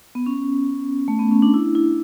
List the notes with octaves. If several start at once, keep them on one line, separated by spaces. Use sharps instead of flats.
B3
C#4
A3
B3
C#4
D4
E4
E4